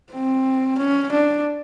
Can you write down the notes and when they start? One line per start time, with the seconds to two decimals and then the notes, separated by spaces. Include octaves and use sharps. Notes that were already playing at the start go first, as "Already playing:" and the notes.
0.12 C4
0.78 C#4
1.11 D4